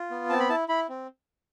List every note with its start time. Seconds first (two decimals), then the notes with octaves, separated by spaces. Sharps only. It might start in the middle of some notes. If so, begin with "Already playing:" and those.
Already playing: F4
0.10 B3
0.29 C4 A5
0.40 B5
0.49 E4 A5
0.68 E4 B5
0.89 C4